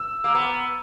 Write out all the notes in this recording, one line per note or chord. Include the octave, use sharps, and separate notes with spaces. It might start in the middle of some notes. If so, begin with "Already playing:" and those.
Already playing: E6
A#3
B3